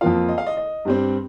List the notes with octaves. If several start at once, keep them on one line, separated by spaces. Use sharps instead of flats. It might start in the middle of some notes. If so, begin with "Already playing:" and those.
F2 F3 A#3 F4 F5
D#5
F5
D#5
D#5
G2 G3 C4